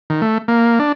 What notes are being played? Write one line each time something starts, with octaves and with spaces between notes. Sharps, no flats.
D#3
A3
A#3
D4